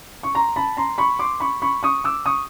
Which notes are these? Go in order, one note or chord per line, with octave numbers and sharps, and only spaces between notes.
C#6
A#5 C6
A5 B5
A#5 C6
B5 C#6
C6 D6
B5 C#6
B5 C#6
C#6 D#6
D6 E6
C#6 D#6